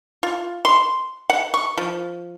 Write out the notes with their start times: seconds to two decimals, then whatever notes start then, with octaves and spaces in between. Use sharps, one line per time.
0.23 F4
0.65 C6
1.30 F#5
1.54 C#6
1.77 F3